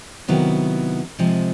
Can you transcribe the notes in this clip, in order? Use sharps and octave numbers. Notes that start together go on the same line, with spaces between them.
C3 D#3 F#3 B3 E4
C3 F3 G#3